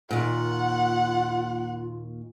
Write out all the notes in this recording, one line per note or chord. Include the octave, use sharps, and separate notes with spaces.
D#2 A#2 F4 F#5